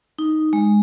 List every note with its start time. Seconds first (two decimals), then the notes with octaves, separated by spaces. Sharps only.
0.19 D#4
0.53 G#3